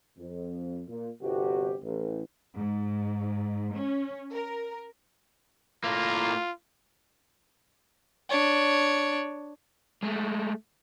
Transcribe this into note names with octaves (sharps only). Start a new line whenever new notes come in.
F2
A#2
G1 C3 F#4 G4
A1
G#2
C#4
A#4
A2 A#3 F4
D4 C#5
G#3 A3